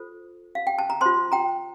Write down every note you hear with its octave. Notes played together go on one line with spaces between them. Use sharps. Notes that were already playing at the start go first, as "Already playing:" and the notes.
Already playing: F4 A4 C5
F5
G5
A5
A#5
F4 C5 A5 C6
G5 A#5